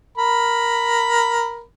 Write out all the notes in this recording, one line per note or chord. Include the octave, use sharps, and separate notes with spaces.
A#4 B5